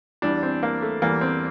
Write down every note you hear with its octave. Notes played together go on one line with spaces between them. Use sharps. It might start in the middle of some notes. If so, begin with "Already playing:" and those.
E2 E3 G3 D4
C4
A#3
A3
E2 E3 G3 A#3
C4